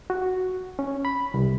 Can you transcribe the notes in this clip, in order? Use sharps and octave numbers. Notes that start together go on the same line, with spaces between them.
F#4
C#4
B5
C2